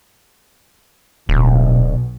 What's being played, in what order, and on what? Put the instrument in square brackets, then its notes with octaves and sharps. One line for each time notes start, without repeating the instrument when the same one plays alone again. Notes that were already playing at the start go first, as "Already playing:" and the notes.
[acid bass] D1 [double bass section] B1 B2